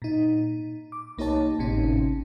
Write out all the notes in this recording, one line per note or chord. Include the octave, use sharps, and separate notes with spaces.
A#2 D#4
D6
C2 A#3 D#4 G4 C#5 A5
G#1 A2 C3 C#4 D#4